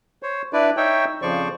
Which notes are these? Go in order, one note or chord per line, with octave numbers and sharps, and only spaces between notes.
C5 C#5
D4 E4 B4 D5
D#4 C#5 E5 G5
F2 C#3 F3 C5 D5 C#6